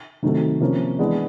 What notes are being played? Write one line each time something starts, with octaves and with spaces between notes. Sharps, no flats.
C3 D#3 F#3 A3
C3 F3 A#3 C#4
E3 G#3 B3 D4